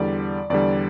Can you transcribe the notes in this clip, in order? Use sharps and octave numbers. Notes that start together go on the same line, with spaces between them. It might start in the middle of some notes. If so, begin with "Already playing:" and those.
Already playing: E2 D3 G3 D5
E2 D3 G3 D5